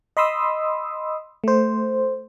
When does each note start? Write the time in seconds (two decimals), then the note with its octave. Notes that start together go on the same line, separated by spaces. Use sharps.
0.17 D#5 B5 C6 D#6 E6
1.44 A3 C5